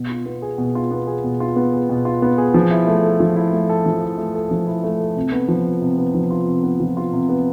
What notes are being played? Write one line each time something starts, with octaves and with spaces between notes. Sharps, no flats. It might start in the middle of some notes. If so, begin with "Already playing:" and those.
Already playing: B2
F4
B3
G#4
B2
F4
B3
G#4
B2
F4
B3
G#4
B2
F4
B3
G#4
F3
E4
A3
A4
F3
E4
A3
A4
F3
E4
A3
A4
F3
E4
A3
A4
C3
B3
F3
F4
C3
B3
F3
F4
C3
B3
F3
F4
C3
B3